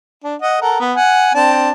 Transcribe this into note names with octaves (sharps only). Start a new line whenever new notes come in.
D4
D#5 F#5
A4 A#4 F#5
B3
F#5 G#5
C4 D4 A5